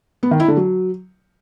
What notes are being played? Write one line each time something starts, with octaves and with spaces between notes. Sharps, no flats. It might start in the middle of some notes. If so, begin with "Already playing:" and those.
B3
D#3
E4
D3
F#3